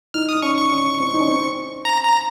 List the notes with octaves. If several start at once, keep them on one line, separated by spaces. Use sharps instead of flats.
D#4 F6
D#6
D#4
C#4 C#6
C#6
C#4
C4
D#4
C#4
C4
A#5
A#5